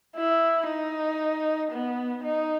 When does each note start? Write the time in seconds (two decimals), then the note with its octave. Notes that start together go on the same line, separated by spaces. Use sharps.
0.16 E4
0.67 D#4
1.72 B3
2.24 D#4